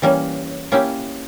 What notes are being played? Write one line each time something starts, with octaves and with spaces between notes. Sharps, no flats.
E3 G3 A#3 C#4
A#3 C#4 E4 G4